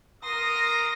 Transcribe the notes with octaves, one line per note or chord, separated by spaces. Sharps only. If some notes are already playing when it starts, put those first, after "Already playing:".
A#4 C6 D#6 A#6